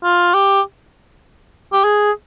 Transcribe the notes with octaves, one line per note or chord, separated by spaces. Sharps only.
F4
G4
G4
G#4